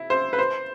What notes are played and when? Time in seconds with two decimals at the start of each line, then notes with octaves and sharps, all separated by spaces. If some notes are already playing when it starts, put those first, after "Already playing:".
Already playing: E4
0.10 C5
0.33 B4
0.39 C5